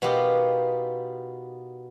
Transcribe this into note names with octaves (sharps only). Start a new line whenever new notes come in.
B2 B3 D#4 F4 G4 A#4